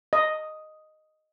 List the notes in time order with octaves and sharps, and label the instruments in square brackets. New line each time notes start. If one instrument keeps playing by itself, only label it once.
[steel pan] D#5